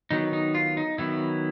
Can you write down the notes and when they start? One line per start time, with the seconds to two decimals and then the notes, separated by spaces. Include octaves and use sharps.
0.11 D#3 F#3 B3 D#4
0.33 D#4
0.55 F4
0.77 D#4
0.98 D#3 F#3 B3 E4